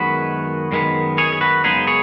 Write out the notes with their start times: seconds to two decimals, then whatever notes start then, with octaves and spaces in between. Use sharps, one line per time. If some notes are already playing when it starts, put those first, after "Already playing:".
Already playing: F#2 D#3 G#3 B3 F#4 B4
0.72 F#2 D#3 G#3 B3
1.18 G#4 C#5
1.32 G#4
1.41 F#4 B4
1.64 F#2 C#3 G#3 B3 D#4 G#4
1.87 G#4 C#5